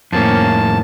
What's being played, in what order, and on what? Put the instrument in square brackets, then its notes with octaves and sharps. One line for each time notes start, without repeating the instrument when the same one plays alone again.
[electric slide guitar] F2 A2 [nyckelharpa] A#3 C#4 [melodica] A5